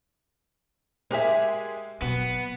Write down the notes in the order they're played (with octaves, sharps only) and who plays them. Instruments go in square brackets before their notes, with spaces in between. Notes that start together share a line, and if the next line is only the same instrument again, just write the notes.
[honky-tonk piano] G#3 G4 G#4 [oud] A#4 E5
[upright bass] B2 F#3 [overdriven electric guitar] B3 [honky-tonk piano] F#4